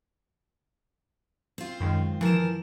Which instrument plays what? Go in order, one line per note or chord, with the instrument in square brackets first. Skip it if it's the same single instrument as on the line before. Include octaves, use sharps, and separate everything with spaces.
[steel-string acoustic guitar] C4 F4
[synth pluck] F#2 D#3 G#3
[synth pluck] E3 E7 [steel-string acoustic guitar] F3 A#4